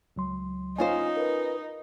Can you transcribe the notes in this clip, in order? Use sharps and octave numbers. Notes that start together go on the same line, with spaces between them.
C#2 F#3 C6
C#4 D#4 F4 C5 G#5
A#4 B4